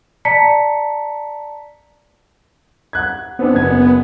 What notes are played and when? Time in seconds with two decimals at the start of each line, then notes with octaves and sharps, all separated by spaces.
0.25 D5 A5 A#5 B6 C#7
2.93 F#5 F#6 G#6
3.39 B3 C4 D4
3.53 F#1 G#6